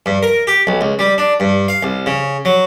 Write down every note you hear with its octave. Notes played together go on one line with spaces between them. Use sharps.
G2
A#4
G4
B1
C#2
G3
D4
G2
F5
C2
C#3
F#3